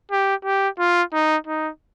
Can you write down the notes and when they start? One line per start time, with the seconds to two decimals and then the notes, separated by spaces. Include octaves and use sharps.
0.11 G4
0.45 G4
0.79 F4
1.13 D#4
1.47 D#4